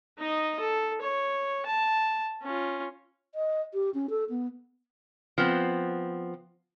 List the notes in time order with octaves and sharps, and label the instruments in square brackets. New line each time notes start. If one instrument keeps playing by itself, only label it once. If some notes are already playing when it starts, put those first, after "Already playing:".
[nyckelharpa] D#4 D#5
A4
C#5
A5
C#4 F4
[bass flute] D#5
G4
C#4
A4
B3
[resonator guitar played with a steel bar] F3 B3 C4